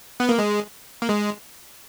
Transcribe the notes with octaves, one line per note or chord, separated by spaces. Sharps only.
B3
A#3
G#3
A#3
G#3